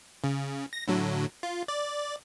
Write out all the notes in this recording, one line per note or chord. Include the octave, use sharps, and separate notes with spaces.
C#3
A#6
A2 D3 F#3
F4
D5